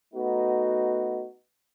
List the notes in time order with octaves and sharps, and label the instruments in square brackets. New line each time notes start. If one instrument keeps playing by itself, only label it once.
[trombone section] A3 B3 D#4 F#4